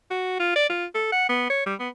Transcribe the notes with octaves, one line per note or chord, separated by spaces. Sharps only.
F#4
F4
D5
F4
A4
F#5
B3
C#5
G3
B3